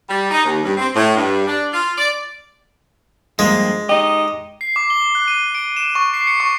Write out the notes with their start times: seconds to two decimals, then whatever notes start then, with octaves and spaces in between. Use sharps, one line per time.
0.09 G3
0.30 D#4
0.45 D#2
0.64 G2
0.77 C4
0.95 A2
1.15 G2
1.47 D4
1.73 F4
1.98 D5
3.39 G2 F3 G#3 A#3
3.89 D#4 G4 D#5
4.61 C7
4.76 D6
4.90 G7
5.15 F#6
5.28 D#7
5.55 D7
5.77 E7
5.95 C#6
6.14 C7
6.27 C#7
6.40 C#6